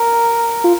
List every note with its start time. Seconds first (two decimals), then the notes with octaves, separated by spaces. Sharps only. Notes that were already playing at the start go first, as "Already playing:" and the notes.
Already playing: A#4
0.64 F4